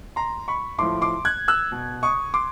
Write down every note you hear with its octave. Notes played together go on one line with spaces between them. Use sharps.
A#5 C6
B5 C#6
A2 F3 C6 D6
C6 D6
F#6 G#6
E6 F#6
B2
C#6 D#6
C6 D6